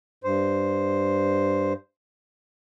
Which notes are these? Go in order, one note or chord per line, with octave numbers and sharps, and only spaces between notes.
G2 C5